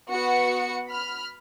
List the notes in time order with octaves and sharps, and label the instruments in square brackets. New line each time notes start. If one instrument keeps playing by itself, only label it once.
[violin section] B3 F#4 F#5 C#7
B5 F6